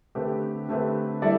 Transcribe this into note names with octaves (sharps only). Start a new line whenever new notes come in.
D3 A3 C4 G4 B4
D3 A3 C4 G4 B4
G3 E4 A4 D5